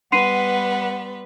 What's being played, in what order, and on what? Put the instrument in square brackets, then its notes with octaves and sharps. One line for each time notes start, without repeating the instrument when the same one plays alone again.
[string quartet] G3 B3 B4 [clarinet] F#5 [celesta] C6 C7 D#7